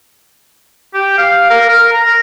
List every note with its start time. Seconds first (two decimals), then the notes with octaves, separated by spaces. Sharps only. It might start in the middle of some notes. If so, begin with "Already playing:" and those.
0.94 G4
1.18 F5
1.50 A#4
1.68 A#4
1.93 A#5